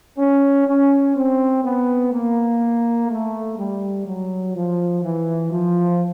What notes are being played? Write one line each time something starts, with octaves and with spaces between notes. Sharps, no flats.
C#4
C#4
C4
B3
A#3
A3
G3
F#3
F3
E3
F3